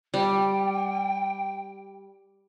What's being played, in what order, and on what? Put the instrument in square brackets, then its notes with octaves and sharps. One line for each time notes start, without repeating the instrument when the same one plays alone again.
[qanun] G3 [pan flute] G5